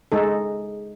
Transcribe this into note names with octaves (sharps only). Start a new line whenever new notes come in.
G#3 D#4 A4